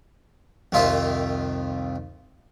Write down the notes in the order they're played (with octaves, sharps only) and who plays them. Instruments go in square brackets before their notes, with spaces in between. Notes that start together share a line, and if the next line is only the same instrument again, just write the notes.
[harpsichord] C2 F2 D#3 F4 E5